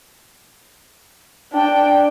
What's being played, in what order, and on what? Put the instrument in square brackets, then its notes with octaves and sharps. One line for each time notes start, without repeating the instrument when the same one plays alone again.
[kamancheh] D4 G5